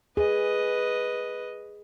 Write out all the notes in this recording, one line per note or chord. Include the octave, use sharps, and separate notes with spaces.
G#4 B4 D#5